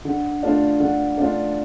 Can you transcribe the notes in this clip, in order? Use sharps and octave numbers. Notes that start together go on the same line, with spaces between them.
D3
A3 D4 F4
D3
A3 D4 F4